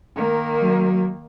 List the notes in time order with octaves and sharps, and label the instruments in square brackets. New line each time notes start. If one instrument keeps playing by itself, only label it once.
[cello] D#3 A#3
[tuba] F#3